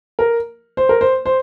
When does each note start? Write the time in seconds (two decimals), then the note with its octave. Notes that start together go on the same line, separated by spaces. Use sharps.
0.19 A#4
0.77 C5
0.89 A#4
1.01 C5
1.26 C5